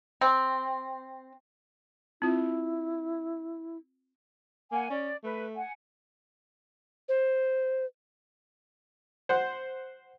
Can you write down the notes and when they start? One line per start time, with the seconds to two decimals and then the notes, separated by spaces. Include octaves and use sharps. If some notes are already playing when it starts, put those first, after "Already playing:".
0.21 C4
2.22 C4 E4 F4
4.71 A#3 F#5 G#5
4.90 C#4 D5
5.24 A3 B4
5.55 F#5 G#5
7.09 C5
9.29 C5 F#5